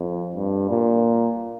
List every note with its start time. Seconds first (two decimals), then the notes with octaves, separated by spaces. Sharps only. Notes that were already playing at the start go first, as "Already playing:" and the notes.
Already playing: F2
0.35 G2
0.70 A#2